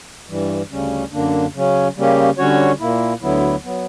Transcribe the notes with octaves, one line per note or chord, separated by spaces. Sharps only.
G2 E3 G3
D2 C#3 G3 C#4
F#2 D3 A#3 D4
C#3 F#3 C#4
C#3 G3 A#3 C#4 G4
D3 G3 C#4 F#4 C#5
A#2 A#3 E4
D2 D3 F#3 B3 E4
F#3 B3